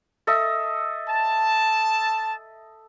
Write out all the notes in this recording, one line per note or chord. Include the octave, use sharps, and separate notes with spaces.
A4 D#5 E5
A5